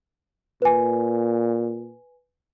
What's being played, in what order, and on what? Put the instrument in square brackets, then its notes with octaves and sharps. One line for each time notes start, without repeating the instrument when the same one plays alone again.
[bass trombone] A#2 [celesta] B4 G#5